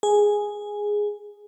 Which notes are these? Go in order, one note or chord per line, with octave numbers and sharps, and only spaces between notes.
G#4